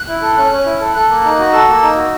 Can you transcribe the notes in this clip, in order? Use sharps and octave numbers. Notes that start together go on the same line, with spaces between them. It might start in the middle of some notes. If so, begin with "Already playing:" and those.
Already playing: F#6
E4
A4
C#4 F#6
C#4
E4
A4
A4 F#6
A#3
D#4
F#4
A4 E6
A#3
D#4
F#4